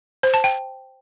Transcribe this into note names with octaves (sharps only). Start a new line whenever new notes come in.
C5
A5
G5